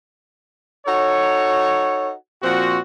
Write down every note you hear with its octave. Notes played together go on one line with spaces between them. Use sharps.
D#4 F#4 A4 C#5
A#2 F3 C4 F#4